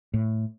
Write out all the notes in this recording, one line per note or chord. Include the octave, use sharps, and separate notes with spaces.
A2